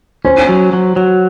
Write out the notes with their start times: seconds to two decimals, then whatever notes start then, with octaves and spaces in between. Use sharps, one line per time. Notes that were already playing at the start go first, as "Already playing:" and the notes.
0.25 C#4 C5
0.49 F#3
0.73 F#3
0.96 F#3